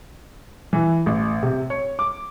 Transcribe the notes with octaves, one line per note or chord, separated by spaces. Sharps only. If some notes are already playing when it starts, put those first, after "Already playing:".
E3
A1
C3
C#5
D6